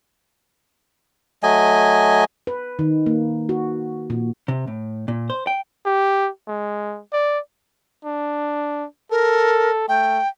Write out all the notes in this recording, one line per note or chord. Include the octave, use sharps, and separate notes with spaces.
F#3 A3 D#5 G#5
B4
D#3
A#3
F#4
A#2
C3
A2
A#2
C5
G5
G4
G#3
D5
D4
A4 A#4
A3 G5